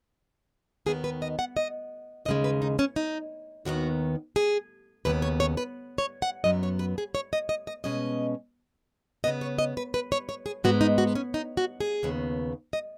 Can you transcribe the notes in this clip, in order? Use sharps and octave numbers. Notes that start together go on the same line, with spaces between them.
D#2 D#3 B3 G#4
B4
D#5
F#5
D#5
D#2 C#3 G#3 D#5
B4
D#4
C#4
D#4
D#2 D#3 B3 F#4
G#4
D#2 C#3 B3 B4
C#5
C#5
B4
C#5
F#5
F#2 F#3 B3 D#5
C#5
B4
G#4
C#5
D#5
D#5
D#5
B2 G#3 C#4 D#5
C#3 B3 D#5
C#5
D#5
B4
B4
C#5
C#5
G#4
G#2 G#3 B3 F#4
D#4
F#4
C#4
D#4
F#4
G#4
D#2 C#3 B3
D#5